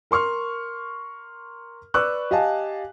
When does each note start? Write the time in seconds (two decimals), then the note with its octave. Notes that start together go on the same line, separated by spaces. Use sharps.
0.11 A#4 C6 C#6 F6
1.94 B4 D5 C#6 D6 E6 F#6
2.31 G4 D#5 F5 G#5 A5